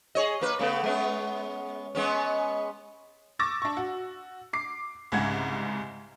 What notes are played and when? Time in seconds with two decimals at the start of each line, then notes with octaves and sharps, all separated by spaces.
0.15 G#4 C#5 D#5
0.41 A#3 B4
0.59 C#3 A3 B3
0.84 G#3 B3 C#4
1.95 G#3 B3 C#4
3.39 C#6 D6 E6 A6 A#6
3.62 D4 C#6
3.77 F#4
4.53 D6 C7
5.12 C2 G#2 C#3 F#5 G#6